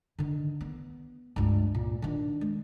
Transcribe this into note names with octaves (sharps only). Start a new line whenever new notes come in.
D3 D#3
B3
C#2 G2
A#2
D#3 D4
G#3